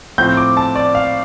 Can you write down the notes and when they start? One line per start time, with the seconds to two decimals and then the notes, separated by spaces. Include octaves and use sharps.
0.18 A2 F3 C4 G6
0.37 D6
0.57 A5
0.75 D5
0.95 F5